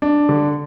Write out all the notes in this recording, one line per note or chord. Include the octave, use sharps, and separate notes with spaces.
D4
D3